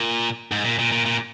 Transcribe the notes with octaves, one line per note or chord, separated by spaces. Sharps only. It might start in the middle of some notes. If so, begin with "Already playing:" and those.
Already playing: A#2
G#2
A#2
A#2
A#2
A#2